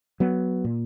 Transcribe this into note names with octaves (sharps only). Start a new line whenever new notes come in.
F#3 B3
A#2